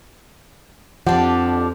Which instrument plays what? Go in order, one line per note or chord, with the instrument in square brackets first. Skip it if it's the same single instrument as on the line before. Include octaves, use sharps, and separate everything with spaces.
[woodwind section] F2 [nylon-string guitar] F3 [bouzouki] D4 G4 [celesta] F#5